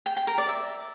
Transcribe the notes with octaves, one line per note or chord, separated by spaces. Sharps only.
G5
G5
A#4
D5
E5